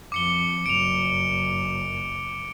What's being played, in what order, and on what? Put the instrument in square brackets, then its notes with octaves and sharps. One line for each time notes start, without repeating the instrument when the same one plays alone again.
[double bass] F2 F3 [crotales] D6 C#7 G7
[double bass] F#1 F#2 [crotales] D7 F7